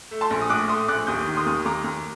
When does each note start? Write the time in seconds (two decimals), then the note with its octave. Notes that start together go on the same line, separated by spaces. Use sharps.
0.11 A3
0.21 A5 C6
0.30 A#1
0.41 D#6
0.49 A2 D6 F#6
0.69 A3 C6 D#6
0.88 A#1 D6 F#6
1.07 D#2 D#6 G6
1.26 D#3
1.36 C6 D#6
1.46 D#2
1.65 D#2 A#5 D6
1.84 D#2